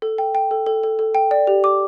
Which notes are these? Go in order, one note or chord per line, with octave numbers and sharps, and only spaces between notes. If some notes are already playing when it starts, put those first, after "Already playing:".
A4
G5
G5
A4
A4
A4
A4
G5
D5
G4
D6